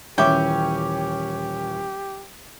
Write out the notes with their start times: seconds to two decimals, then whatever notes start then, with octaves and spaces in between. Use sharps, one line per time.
0.18 D#1 E3 C#4 G4 E5 G5 B5 D6